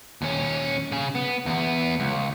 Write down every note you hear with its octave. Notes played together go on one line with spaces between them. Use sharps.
D#2 C#4
C#3 G#4
B3
E2 B3
C#2